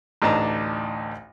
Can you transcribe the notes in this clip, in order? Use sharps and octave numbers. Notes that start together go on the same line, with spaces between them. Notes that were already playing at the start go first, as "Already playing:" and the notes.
A1 D2 D4 D#4 A5 A#5